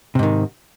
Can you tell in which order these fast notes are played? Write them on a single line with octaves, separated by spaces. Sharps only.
C3 G#2 D#3